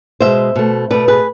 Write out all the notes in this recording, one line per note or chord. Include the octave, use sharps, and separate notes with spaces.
B2 G#3 C5 E5
B2 A3
B2 A3 B4 D5
G#4 B4